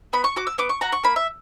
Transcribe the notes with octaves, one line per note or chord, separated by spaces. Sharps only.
B3 B5
C#6
F#4 D6
E6
B3 D6
C#6
F#4 A#5
C#6
A#3 B5
E5